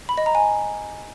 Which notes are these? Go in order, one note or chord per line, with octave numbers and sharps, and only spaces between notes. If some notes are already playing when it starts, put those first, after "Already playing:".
B5
D#5
A#5
G#5